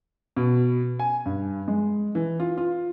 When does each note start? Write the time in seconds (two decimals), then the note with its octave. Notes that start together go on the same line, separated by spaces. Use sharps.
0.37 B2
0.99 G#5
1.26 G2
1.68 G#3
2.15 E3
2.40 F4
2.58 F4